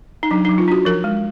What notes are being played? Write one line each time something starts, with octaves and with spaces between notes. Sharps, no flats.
D#4
F#3 D4
F#3 D#4
F4
D4 F#4
F3 A#4
G#3